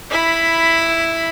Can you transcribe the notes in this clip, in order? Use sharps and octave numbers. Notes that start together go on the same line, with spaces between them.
E4 B5